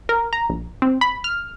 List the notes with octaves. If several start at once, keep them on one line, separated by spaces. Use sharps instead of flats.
A#4
A#5
A#1
C4
B5
F6